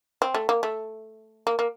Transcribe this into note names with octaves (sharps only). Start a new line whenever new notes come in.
C4
A3
A#3
A3
A#3
A#3